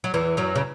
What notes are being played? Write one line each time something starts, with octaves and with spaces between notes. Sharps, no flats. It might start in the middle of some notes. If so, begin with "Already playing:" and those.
F#3
E2 E3
F#2 F#3
C#3